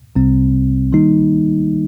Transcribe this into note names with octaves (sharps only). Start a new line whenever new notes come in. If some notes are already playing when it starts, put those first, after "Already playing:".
C2 C3 G3 C4
D#3 G3 A#3 D#4